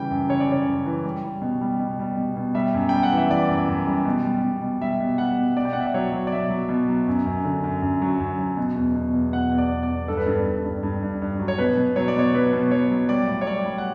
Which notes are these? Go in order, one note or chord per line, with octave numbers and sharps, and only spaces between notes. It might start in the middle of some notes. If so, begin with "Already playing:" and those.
Already playing: C#3 E3 G3 G5
F#2
C#3 C#5
D5
C#3 C#5
F#2
E3
G3
G3
B2
G3
B2
G3
B2
B2
G3 E5
F#2
G3 G5
F#5
E3
E5
E3 D5
F#2
F#2
G3
B2
G3
B2
B2
G3 E5
B2
G3 F#5
B2
B2 D5
G5
B2 F#5
E5
D5
F#3 C#5
F#3
D5
B2 E5
F#3
B2
F#3
F#2
F#2
D3
F#2
F#2
F#3
F#2
F#3
B2
E2
B2
E2
B2 F#5
E2
D5
E2
D5
E2
G2 A4
B4
G2 A4
G2
G2
G2
G2
G2
F#3
C#5
B2 B4
B2
F#3 C#5
D5
B2 C#5
F#3 B4
B2
F#3 C#5
F#3
G3 D5
A2
C#5
G3 D5
G3
F#5